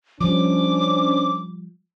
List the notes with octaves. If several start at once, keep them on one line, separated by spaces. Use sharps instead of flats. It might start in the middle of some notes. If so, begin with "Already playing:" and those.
F3 G3 C#4 D4 C5 D6